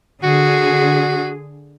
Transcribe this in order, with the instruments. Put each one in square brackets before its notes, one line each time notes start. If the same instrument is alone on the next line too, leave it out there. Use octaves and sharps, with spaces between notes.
[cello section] D3 G#4 [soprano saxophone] F#4